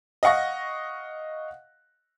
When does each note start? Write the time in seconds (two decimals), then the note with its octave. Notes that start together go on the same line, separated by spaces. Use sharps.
0.23 D#5 F5 F#5 C#6 A#6